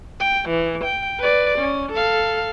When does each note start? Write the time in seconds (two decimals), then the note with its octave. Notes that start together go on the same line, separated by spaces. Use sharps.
0.20 G5
0.49 E3
0.84 G5
1.19 B4 D5
1.59 C#4
1.92 A4 F5